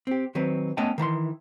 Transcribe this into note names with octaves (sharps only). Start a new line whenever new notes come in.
C4 G4
D#3 F#3 C4 B4
A3 B3 C#4 D#5 G5 A5
D#3 E3 A#5 C6